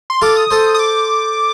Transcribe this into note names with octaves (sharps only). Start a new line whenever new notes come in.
C6
F4 A4 D6
D#6
A4 C5
D#6
D6